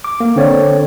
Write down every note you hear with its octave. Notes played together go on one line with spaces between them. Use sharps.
D6
A#3
D3 C4 C#5 D5